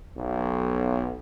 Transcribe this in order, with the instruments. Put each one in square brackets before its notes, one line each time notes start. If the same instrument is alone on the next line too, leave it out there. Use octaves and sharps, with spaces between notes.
[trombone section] B1